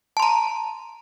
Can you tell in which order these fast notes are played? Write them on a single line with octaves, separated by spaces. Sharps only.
A5 C6 A#5